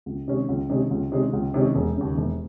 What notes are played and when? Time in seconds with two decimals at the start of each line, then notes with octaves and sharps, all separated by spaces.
0.06 C#2
0.28 C3 D#3 G#3 C#4
0.48 C#2
0.70 C3 D#3 G#3 C#4
0.91 C#2
1.12 C3 D#3 G#3 C#4
1.33 C#2
1.54 C3 D#3 G#3 C#4
1.75 E1
1.97 D#2 C#3
2.18 E1